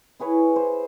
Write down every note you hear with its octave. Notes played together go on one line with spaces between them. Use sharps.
E4 G#4 B4 C#5
C5